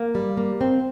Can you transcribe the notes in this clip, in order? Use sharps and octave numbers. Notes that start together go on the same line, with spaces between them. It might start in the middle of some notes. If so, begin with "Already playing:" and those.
Already playing: A#3
G3
A#3
C4